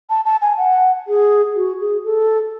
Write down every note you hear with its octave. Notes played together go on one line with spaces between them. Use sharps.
A5
A5
G#5
F#5
G#4
F#4
G#4
A4